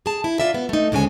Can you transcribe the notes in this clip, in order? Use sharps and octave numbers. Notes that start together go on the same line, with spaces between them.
G#4 A5
E4
F4 D5 E5
B3
A3 D#4
D2 C#3 G#3 C#4 G#5